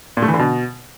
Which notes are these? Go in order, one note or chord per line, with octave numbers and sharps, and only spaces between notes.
A#2
A3
E3
D3
B2